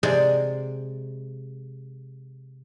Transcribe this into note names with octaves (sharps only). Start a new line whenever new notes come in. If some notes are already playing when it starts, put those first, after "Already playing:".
C3 G#3 G#4 D5